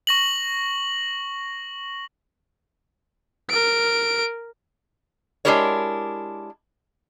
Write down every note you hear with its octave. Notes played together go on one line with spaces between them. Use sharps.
C#6 A#6 F#7
A#4 D7
G#3 D4 E4 G4 A#4 C#5